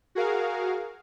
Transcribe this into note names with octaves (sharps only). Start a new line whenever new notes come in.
F#4 G#4 A#4 F5